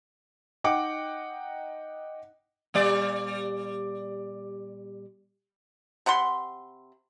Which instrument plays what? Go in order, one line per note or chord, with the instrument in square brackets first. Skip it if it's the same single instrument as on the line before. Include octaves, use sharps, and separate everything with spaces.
[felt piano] D#4 D#5 F#5 G5 D6
[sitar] A#2 G3 D5
[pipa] C3 F#5 B5 C6